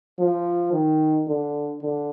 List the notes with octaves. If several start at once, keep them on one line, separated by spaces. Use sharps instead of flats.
F3
D#3
D3
D3